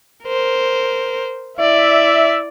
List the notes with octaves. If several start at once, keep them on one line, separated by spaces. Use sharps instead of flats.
A#4 C5
E4 D5 E5